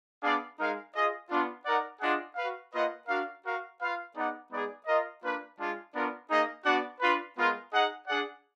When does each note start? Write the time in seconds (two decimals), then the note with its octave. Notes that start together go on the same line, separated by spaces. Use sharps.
0.22 B3 D4 G#4 D5 F5
0.58 G#3 D#4 A#4 F5
0.94 F4 G#4 D#5
1.29 B3 D4 F4
1.65 D#4 A#4 D5 F#5
2.01 D4 F4 G#4 D#5 F#5
2.36 F#4 B4 F5
2.72 A#3 F4 B4 D#5 F#5
3.08 D4 F#4 A#4 F5
3.43 F#4 A#4 F5
3.79 F4 B4 F5
4.14 B3 D#4 G#4 D5 F#5
4.50 G#3 B3 D#4 G#4 D5
4.86 F4 A#4 D#5
5.21 A#3 D4 F4 B4
5.57 G#3 D4 F4
5.93 B3 D4 F4 A#4 D5
6.29 A#3 D#4 G#4 D#5
6.64 B3 D4 F#4 D5 F#5
7.00 D4 F4 B4
7.36 G#3 B3 F4 A#4
7.72 D#4 G#4 D#5 F#5
8.08 D4 G#4 D5 F#5